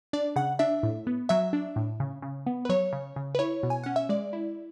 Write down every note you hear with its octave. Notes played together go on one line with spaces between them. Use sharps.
D4 D5
C#3 F#5
D4 E5
A2
B3
F#3 E5
D4
A2
C#3
C#3
B3
B4
F#3 C#5
C#3
C#3
B4
E4 C#5
B2
G#5
C#4 F#5
E5
G#3 D5
E4